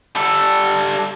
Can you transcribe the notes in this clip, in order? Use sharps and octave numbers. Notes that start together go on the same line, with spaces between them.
G3 A4